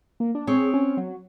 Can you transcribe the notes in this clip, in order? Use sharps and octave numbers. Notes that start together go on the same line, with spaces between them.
A#3
D4
C4 G#4 C#5
C#4
F#3